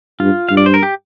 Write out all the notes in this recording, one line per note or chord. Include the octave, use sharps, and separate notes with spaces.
G2 F4
G2 F5
D5
C5
A#4
G4